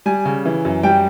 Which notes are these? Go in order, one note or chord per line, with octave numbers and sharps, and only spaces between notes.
G3 G#5
C#3
E3
F#2
G3 G5